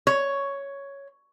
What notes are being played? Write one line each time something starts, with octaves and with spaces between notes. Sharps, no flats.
C#5